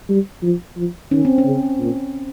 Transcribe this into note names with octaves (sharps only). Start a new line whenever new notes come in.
G3
F3
F3
D#3 C#4
C4
C#4
C#3
A#2